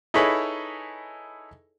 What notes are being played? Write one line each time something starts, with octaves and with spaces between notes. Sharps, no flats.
D#4 E4 G#4 A4 B4 C#5